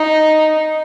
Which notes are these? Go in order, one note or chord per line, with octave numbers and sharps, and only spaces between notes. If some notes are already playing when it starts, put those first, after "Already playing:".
Already playing: D#4